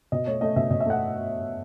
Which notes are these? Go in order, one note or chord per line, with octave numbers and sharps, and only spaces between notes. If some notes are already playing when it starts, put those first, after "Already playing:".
B2 D#5
A3 C#5
A3 D#5
B2 E5
B2 D#5
E5
A3 F#5